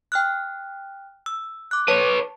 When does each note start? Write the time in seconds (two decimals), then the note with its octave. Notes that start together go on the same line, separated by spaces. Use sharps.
0.12 G5 F6 F#6
1.26 E6
1.71 D6 F#6
1.88 B4 C#5 A5